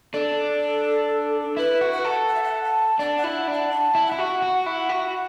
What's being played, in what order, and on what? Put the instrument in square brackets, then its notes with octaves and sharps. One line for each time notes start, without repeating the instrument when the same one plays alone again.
[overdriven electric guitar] D4 [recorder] A4
[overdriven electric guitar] E4 [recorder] B4
[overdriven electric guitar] F#4
[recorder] F#5
[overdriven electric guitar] A4
[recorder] F#5
E5
F#5
A5
[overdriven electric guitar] D4 [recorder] A5
[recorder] F#5
[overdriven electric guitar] E4
D4
[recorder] F#5
A5
[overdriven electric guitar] E4
[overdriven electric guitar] E4 [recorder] F#5
[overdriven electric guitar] F#4
F#4
E4
F#4